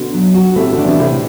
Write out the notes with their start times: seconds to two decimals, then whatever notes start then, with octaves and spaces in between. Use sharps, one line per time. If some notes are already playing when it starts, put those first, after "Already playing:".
Already playing: B2 D3
0.13 F#3
0.34 F#4
0.56 A2 C3 A3
0.70 B2 D3
0.78 D4
0.85 C3 E3
0.99 A2 C3